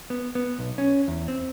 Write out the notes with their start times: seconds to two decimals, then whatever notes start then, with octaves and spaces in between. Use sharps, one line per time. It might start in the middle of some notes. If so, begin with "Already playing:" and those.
0.10 B3
0.35 B3
0.59 B1
0.78 C#4
1.08 E2
1.28 C4